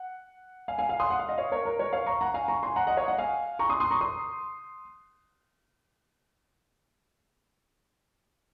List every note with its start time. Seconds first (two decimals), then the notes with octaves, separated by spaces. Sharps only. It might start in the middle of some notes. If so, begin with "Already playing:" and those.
Already playing: F#5
0.68 F5 G#5
0.78 F5 G#5
0.89 F5 G#5
1.00 C6 D#6
1.10 F#5
1.19 F5
1.29 D#5
1.38 C#5 F5
1.52 A#4 C#5
1.65 A#4
1.79 A#4 C#5
1.93 C#5 F5
2.06 A#5 C#6
2.21 F#5 A#5
2.34 F5 G#5
2.48 A#5 C#6
2.63 G#5 C6
2.76 F#5 A#5
2.87 D#5 F#5
2.97 C#5 F5
3.08 D#5 F#5
3.18 F5 G#5
3.59 A#5 C#6
3.69 C6 D#6
3.80 C6 D#6
3.91 A#5 C#6
4.01 C6 D#6